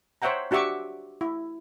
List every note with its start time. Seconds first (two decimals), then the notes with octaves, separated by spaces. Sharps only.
0.22 C5 C#5 E5 F#5 G5 A#5
0.51 D4 F#4 G4 E5 C#6 D6
1.21 E4